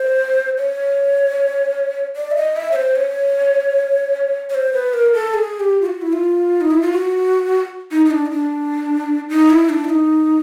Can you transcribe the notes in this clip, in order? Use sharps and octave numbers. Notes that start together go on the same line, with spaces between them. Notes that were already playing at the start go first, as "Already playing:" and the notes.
Already playing: C5
C#5
D5
E5
D#5
E5
C#5
C5
C#5
C#5
C5
B4
A#4
A4
G#4
G4
F4
F#4
E4
F4
D#4
E4
F4
F#4
D#4
D#4
D4
D#4
D4
D#4
E4
D4
E4
D#4